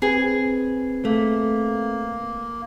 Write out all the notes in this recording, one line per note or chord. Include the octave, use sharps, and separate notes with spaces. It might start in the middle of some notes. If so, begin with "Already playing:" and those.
C4 G#4 B4
A3 A#3